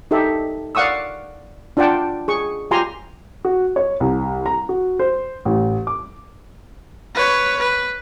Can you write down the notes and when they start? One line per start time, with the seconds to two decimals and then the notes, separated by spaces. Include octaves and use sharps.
0.11 D#4 G4 A4 E5
0.75 D5 F5 F#5 C#6 D#6 E6
1.77 D4 F4 D5 F#5 G5 A5
2.28 G#4 C#6
2.71 F4 G4 G#5 A#5 C6
3.45 F#4
3.76 C#5
4.00 C2
4.46 A#5
4.69 F#4
4.99 C5
5.45 A1
5.87 D6
7.15 B4 C#5
7.60 B4